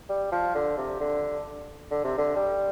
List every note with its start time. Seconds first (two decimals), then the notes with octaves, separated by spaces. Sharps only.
0.09 G3
0.32 F3
0.55 D3
0.78 C3
1.00 D3
1.91 D3
2.04 C3
2.18 D3
2.36 G3